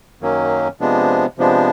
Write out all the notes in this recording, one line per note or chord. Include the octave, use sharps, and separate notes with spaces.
F#2 D#3 F#3 A#3 C#4
C3 F3 G#3 B3 D4
C3 F3 G#3 B3 D4